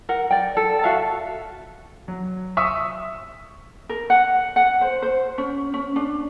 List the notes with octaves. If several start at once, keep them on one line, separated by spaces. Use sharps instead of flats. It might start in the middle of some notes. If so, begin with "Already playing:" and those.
A#4 F#5
D5 G5
A4
F#4 E5 F5 A5
F#3
E5 C#6 D#6 E6
A#4
F#5
F#5
C5
C5
C#4
C#4
D4